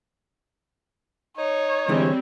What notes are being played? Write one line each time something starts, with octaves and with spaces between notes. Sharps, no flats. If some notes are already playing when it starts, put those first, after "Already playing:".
D#4 C#5
D3 E3 G3 G#3 C4